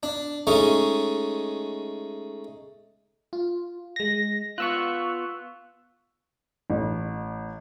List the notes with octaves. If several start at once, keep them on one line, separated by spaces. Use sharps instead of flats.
D4
G#3 A3 C#4 D#4
F4
G#3 A#6
B3 F4 C#6 E6 F#6
A1